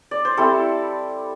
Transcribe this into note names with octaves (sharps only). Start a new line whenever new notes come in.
D5
C5
G3 C4 E4 A4